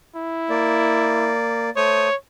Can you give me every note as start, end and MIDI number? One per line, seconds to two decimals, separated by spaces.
0.16 1.34 64
0.50 1.70 58
0.50 1.70 74
1.76 2.09 57
1.76 2.09 72
1.76 2.15 73
1.76 2.09 87